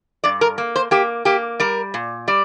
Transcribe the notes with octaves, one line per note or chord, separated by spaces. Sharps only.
G2 D5
A#4
A#3
C5
A#3 G4
A#3 G4
G3 A#4
A#2
G3 D5